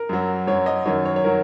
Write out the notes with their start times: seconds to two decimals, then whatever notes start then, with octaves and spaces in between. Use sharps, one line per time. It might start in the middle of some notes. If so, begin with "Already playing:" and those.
Already playing: A#4
0.09 F#2 F#3
0.47 F#2 F#3 C#5
0.66 D#5
0.85 F#2 D#3 F#3 C#5
1.05 C#5
1.16 C#5
1.24 D#3 F#3 A#4